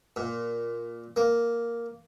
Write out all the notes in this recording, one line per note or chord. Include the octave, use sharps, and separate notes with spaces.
A#2
A#3